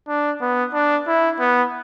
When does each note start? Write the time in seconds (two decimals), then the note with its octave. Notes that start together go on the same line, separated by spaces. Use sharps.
0.08 D4
0.41 B3
0.74 D4
1.07 E4
1.40 B3